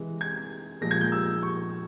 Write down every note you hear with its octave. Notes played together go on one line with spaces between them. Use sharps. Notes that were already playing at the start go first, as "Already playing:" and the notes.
Already playing: C3 E3 G#3
G#6
A#2 F3 G#3 A#6
G#6
G6
E6
C#6